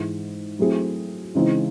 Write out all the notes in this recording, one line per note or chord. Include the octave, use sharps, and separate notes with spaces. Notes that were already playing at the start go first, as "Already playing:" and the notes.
Already playing: G#2 E3 G#3
F#3 A3 C4 E4 G#4
C#3 E3 G#3 C4 D#4